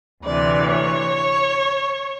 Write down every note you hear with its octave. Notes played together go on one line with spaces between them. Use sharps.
D2 C3 E3 D5
C#5